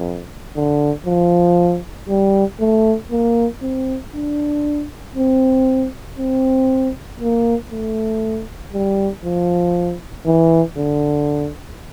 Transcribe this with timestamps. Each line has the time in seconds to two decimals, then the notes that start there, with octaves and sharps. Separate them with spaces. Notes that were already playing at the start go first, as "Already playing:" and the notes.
Already playing: F2
0.56 D3
1.06 F3
2.09 G3
2.60 A3
3.11 A#3
3.62 C4
4.13 D4
5.16 C4
6.18 C4
7.20 A#3
7.71 A3
8.73 G3
9.24 F3
10.26 E3
10.78 D3